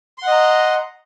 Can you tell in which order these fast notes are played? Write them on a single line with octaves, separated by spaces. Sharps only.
C6 F#5 D#5 A#5